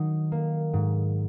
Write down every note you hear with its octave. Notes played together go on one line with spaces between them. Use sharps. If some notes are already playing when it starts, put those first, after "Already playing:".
Already playing: D#3 F#3 D#4
A#3
G#2